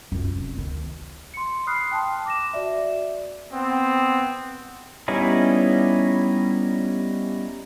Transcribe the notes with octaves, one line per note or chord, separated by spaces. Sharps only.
F#2 F4
F1
D2 D#3
C6 C#7
B5 D#6 F6 F#6 C7
G5 A5 C6
D6 A#6 E7
F#4 D5 E5
B3 C4
G3 B3 C#4 D#4 E4